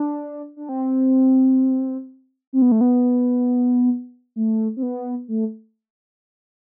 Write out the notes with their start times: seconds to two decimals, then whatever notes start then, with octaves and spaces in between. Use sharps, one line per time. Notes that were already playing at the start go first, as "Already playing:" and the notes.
Already playing: D4
0.56 D4
0.69 C4
2.53 C4
2.62 B3
2.72 A3
2.81 B3
4.36 A3
4.77 C4
4.83 B3
5.28 A3